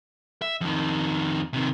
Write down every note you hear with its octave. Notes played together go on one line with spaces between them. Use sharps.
E5
F2 D#3
C3 D#3